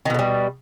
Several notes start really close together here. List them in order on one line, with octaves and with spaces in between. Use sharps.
D#3 B2 D3 G3